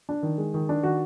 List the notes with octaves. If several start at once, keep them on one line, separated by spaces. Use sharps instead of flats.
D4
D#3
G#3
D#3
D4
D#3 F#4